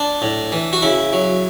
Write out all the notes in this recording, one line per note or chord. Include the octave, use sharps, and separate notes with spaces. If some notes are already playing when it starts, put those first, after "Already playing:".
Already playing: D4
A2
E3
F#4
C#3 E4
F#3